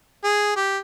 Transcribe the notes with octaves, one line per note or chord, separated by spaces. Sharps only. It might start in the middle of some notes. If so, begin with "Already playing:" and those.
G#4
G4